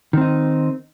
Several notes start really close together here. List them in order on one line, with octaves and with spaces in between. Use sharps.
D#3 C4 D#4